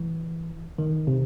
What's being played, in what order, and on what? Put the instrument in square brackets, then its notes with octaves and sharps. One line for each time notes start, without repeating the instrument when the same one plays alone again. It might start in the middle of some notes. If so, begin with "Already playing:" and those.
Already playing: [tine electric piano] E3
D#3
C3